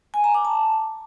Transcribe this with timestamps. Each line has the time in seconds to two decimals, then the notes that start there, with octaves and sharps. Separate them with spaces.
0.14 G#5
0.24 A#5
0.34 D6
0.45 A5